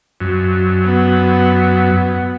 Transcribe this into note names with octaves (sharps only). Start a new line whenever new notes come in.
F#2
B3